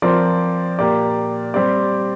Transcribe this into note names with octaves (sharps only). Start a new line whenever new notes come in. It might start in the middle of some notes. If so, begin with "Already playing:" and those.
F3 C4 A#4 D5
A#2 A#3 G4 D5
G3 C4 G4 D5